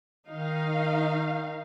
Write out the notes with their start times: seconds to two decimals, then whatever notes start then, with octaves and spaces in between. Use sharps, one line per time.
0.28 D#3 D#4 F5